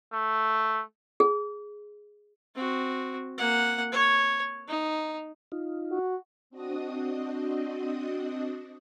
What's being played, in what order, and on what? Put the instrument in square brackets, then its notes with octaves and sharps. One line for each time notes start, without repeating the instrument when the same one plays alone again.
[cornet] A3
[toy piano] G#4
[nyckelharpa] C4 F#4
A#3 F#5
C#5
D#4
[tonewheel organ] D#4 F4
[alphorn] F#4
[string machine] C4 D4 F#4 D#5 D#6